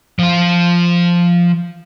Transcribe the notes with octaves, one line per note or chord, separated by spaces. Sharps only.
F3 F4